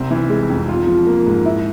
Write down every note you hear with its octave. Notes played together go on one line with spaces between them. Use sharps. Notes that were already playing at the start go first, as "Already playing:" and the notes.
Already playing: C2 C4
E3
G#3
F2
F4
F3
A#3
G#2
E4